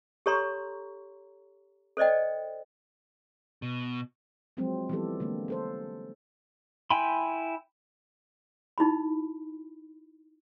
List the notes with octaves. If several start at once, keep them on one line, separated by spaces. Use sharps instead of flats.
G4 A4 C#5 A#5 C6 C#6
A4 C5 D5 D#5 G5
B2
F3 F#3 G#3 C4
E3 F3 G3 B3 G4 A4
D3 G#3 A#3
C#4 A4 C5
E4 G5 G#5 B5 C6
D#4 E4 F#4 B5